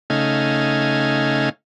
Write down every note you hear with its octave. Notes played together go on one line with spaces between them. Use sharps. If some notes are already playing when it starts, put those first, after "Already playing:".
C#3 A3 D#4 F5 G#5